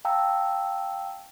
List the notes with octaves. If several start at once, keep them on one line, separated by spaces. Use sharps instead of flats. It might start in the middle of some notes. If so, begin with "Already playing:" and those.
F5 G5 A5 A#5 E6